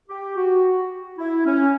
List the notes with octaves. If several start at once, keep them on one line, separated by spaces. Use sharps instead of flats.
G4
F#4
E4
C#4